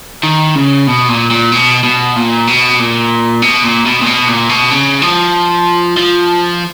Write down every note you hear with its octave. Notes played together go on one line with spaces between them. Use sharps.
D#3
C#3
B2
A#2
A#2
B2
B2
A#2
B2
A#2
B2
A#2
B2
A#2
B2
A#2
B2
C#3
F3
F3